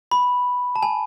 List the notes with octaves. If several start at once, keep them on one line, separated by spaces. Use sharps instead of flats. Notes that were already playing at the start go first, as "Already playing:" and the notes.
B5
A5
G#5